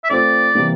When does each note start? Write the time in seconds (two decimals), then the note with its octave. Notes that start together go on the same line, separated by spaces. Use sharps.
0.04 E5
0.10 A3 C4 F4 C5 D5
0.55 C3 E3 G3 A#3